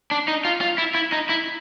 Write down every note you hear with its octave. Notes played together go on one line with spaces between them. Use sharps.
D4
D#4
F4
F4
E4
E4
D#4
E4